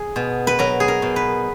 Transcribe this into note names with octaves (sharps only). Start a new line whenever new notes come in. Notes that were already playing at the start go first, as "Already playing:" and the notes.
Already playing: G#4
B2
B4
F#3 A#4
G#4
A#4
B2
B4